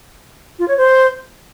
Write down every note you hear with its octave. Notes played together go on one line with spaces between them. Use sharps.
F4
C#5
C5